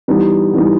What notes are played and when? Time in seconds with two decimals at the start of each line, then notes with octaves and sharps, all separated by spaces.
0.08 E3 G3 B3 D#4
0.53 E3 G3 B3 D#4